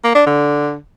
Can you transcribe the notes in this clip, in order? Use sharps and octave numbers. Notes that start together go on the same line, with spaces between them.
A#3
D4
D3